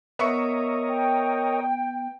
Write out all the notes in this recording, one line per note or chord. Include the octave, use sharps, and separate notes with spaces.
B3 A#4 C#5 D#5 E5 C#6 C#7
G5